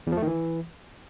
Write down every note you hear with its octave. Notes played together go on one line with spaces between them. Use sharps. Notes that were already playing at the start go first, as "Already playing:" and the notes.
E2
F3
A3
D#3
E3